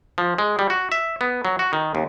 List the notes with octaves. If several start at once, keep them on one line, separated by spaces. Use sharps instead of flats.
F3
G#3
G3
F#4
E5
B3
F#3
F#4
D#3
D#2